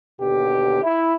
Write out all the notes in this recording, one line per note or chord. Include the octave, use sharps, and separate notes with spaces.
D#2 B2 D3 G4
E4